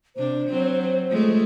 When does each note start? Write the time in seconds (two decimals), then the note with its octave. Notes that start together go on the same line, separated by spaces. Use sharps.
0.16 C3 D4 C5
0.49 F#3 C4
1.08 F3 G#3 A3